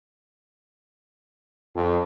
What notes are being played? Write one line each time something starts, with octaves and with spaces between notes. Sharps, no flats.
F2